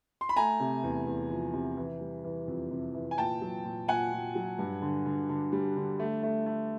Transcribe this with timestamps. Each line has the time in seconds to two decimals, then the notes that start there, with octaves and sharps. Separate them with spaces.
0.21 C6
0.29 B5
0.36 A3 G#5 A#5
0.60 C3
0.83 E2
1.06 E2
1.30 F3
1.54 C3
1.77 E3
2.00 G3
2.24 E3
2.48 F2
2.71 C3
2.94 E3
3.11 G#5
3.18 A#2 G5 A5
3.41 F#3
3.65 A#2
3.88 A#2 F#5 G#5
4.12 A#2
4.35 F#3
4.59 G2
4.82 D3
5.06 D3
5.29 D3
5.52 G3
5.76 D3
5.99 A3
6.23 A3
6.46 A3